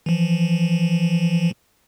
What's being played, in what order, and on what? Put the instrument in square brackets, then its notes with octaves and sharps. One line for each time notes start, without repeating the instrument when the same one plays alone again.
[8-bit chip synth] E3 F3